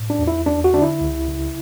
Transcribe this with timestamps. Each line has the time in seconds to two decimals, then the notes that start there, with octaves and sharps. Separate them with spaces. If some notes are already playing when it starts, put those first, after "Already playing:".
Already playing: A2
0.10 D4
0.19 E2
0.27 E4
0.46 E2 D4
0.64 F#4
0.73 D3 D4
0.82 E4
1.01 C#2
1.28 C#3